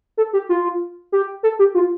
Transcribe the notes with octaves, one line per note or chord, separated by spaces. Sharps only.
A4
G4
F4
G4
A4
G4
F4